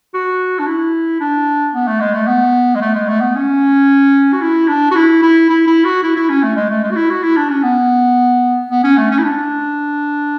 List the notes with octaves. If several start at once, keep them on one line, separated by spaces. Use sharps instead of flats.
F#4
D4
E4
D4
B3
A3
G#3
A3
B3
G#3
A3
G#3
A3
B3
C#4
F#4
E4
D4
F#4
E4
E4
E4
E4
F#4
E4
E4
C#4
A3
G#3
A3
G#3
F#4
E4
F#4
E4
D4
C#4
B3
B3
C#4
A3
C#4
E4
D4